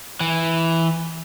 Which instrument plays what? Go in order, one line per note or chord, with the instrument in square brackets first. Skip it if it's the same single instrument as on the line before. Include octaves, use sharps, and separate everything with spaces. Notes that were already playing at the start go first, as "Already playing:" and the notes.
[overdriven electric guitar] E3